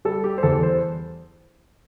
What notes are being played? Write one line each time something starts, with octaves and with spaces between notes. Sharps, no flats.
G3 A4
G4
C5
E2 A4
C5